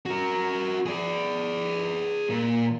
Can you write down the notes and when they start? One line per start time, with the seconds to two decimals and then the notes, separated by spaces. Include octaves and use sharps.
0.06 F#4 A#4
0.86 G#4 D5
2.30 A#2